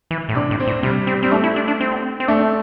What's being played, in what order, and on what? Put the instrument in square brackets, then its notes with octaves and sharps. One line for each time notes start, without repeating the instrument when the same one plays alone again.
[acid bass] E3
A2
[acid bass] C3 [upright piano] D4
[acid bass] A2
[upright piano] C4
[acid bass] A2
[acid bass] C3 [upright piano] G3
[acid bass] C4
[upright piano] G3 [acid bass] C4
[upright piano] A3 [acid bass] D4
[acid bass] E4
D4
D4
C4
C4
[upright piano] A3 [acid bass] D4